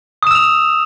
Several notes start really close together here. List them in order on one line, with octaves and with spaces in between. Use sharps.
D#6 E7 E6 F7